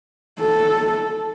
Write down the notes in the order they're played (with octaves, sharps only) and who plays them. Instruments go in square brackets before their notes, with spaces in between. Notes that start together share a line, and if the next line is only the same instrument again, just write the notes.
[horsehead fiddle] A4